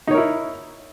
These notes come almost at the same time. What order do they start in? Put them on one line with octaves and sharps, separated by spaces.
D#4 C#5 A#4 E4